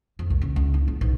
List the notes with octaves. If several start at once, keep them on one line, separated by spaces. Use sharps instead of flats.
F2
C2
C#3
C#2
E4
C#2
B1